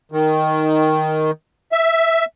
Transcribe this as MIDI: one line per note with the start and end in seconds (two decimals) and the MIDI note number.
0.12 1.31 51
1.72 2.25 76